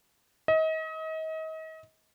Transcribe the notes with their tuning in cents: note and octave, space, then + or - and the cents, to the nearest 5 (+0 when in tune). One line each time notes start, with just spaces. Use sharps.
D#5 +35